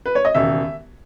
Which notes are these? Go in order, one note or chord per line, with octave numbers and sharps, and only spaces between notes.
B4
C#5
D#5
E1 D#2 C#3 E5